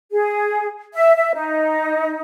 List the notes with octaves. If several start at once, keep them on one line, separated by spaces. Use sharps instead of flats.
G#4
E5
E5
D#4